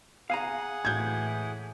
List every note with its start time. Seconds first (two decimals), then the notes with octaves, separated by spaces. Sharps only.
0.30 G#4 F5 F#5 G#5 A#5
0.85 A2 E3 G6 G#6